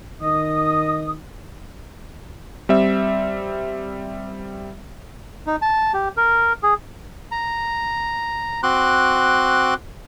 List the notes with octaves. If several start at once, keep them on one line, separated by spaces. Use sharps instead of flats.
D#3 D#5 D#6
G3 C4 E5
D#4
A5
G4
A#4
G#4
A#5
C4 F#4 C6 D6 F#6